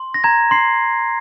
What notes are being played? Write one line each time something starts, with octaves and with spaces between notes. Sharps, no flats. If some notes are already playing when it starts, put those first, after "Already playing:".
Already playing: C6
A#6
A#5 G#6
C6 C7